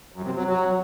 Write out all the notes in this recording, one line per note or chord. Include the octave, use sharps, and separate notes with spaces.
F#2
C3
F#3
F#3